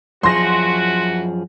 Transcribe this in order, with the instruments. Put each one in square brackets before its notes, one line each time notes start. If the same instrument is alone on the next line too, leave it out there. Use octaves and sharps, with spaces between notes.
[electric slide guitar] F#2 F3 G#4 [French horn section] B3 E4 F#4 [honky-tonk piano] C6 A#6